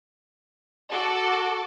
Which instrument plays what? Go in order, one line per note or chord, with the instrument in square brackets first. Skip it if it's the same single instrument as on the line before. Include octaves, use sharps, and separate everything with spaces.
[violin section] F#4 A4 D6